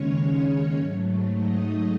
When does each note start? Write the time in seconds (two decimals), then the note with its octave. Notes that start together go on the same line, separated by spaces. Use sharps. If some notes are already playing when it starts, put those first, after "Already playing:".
Already playing: D#2 C#3 G#3 C#4 C#5
0.72 G#2 F#3 A3
1.30 D#4 D#5